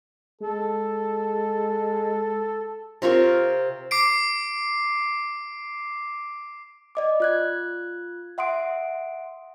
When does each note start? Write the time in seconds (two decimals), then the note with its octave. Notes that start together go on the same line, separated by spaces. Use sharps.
0.41 G#3 A4
3.02 C3 F4 A#4 C#6
3.91 D6 C7 D7
6.95 D5 D#5 D6
7.20 F4 F#6 G#6
8.38 E5 F#5 C6 D#6 D7